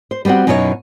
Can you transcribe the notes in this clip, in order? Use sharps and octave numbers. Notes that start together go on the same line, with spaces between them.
C5
G3 B3 C4 F#4 F#5
F#2 B2 D#4 E4 G4 C#5